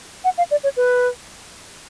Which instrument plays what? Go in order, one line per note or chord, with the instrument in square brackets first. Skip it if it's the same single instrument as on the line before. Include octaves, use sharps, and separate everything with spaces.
[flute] F#5
F5
D5
C#5
B4